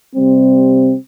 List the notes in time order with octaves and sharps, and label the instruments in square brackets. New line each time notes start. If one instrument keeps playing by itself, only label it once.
[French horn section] C3 G3 C4